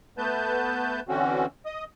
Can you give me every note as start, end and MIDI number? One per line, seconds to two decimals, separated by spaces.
0.18 1.00 57
0.18 1.00 59
0.18 1.00 71
0.18 1.00 81
0.18 1.00 91
1.08 1.46 50
1.08 1.46 52
1.08 1.46 60
1.08 1.46 61
1.08 1.46 66
1.66 1.84 75
1.66 1.84 87